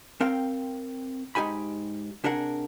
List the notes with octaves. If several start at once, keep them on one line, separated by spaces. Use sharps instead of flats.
C4 A#4 F5 G5
G#2 D#4 G4 G#5 B5
C3 D4 G#4 A#4 F#5